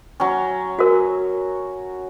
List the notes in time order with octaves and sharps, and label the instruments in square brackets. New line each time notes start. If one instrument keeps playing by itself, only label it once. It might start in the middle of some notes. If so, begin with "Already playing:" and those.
[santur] F#3 C#4
[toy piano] F#4 A#4